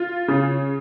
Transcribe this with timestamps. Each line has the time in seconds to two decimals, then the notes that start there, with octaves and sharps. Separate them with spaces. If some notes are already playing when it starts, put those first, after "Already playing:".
Already playing: F4
0.28 C#3